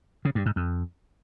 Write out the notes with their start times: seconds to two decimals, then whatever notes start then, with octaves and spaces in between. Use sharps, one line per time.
0.25 C#3
0.35 G2
0.46 G#2
0.56 F2